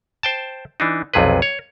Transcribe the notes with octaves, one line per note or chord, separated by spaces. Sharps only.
C5 G5 A5
E3 D4 D#4
B1 F2 C3 G#4 B4
C#5